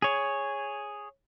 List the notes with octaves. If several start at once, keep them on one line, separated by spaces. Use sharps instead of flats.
G#4 C#5